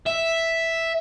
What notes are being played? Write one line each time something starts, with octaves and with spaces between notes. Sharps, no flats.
E5